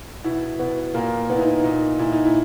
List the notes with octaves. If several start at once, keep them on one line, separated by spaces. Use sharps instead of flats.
B2 E4
B2 B3
A#2 A#3
A#2 B3
E4
D#4
A#2 D#4
A#2 E4
D#4
E4